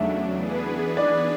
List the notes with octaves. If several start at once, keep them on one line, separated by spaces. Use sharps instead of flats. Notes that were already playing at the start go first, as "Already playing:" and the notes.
Already playing: E2 C#3 F#3 A3 D4 E5
E3 B3 D4 G#4 B4
D5